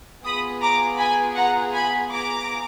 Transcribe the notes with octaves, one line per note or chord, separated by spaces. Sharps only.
B3 F4 G#4 B5 D#6
A#5 D6
G#5 B5
F#5 A#5
G#5 B5
A#5 D6